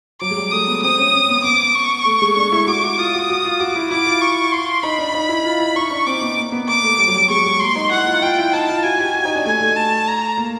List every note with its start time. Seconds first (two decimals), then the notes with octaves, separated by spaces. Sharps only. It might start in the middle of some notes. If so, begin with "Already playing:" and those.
0.21 F#3 D6
0.31 G#3
0.37 G3
0.51 A3 D#6
0.68 B3
0.82 C4 D#6
0.99 C#4
1.13 C4
1.29 B3
1.44 B3 D6
1.75 C#6
2.05 A3
2.22 G#3
2.36 D4
2.52 E4
2.67 F#4 D6
2.83 F#4
2.98 F4 D#6
3.14 F#4
3.29 F#4
3.44 F4
3.60 F#4 D6
3.76 E4
3.91 E4 D6
4.06 F4
4.21 C#6
4.52 C6
4.83 D#4 B5
4.99 D4
5.14 D#4
5.29 E4
5.45 F4
5.60 E4
5.75 D#4 C#6
5.91 D4
6.07 C4 D6
6.22 B3
6.38 A#3
6.52 B3
6.68 A#3 D6
6.84 A3
6.98 G3
7.07 F#3
7.15 G3
7.30 G#3 C#6
7.45 G#3
7.60 A#3 C6
7.75 D#4
7.91 E4 F#5
8.07 F4
8.22 F4 G5
8.38 E4
8.53 D#4 A5
8.69 F4
8.83 F#4 G#5
8.99 G4
9.14 F#4
9.25 D#4
9.36 D4
9.45 A3 G#5
9.61 A3
9.76 A5
10.07 A#5
10.38 A#3